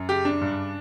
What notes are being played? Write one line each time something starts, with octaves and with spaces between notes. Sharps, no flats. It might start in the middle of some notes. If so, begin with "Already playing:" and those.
Already playing: F#2
C#3 G4
D4
G2